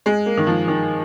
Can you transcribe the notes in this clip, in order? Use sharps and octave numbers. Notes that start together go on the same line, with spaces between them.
G#3
A#3
D#3
F3
D#3